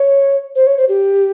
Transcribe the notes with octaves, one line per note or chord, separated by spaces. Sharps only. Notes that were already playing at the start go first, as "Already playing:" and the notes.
Already playing: C#5
C5
C#5
C5
G4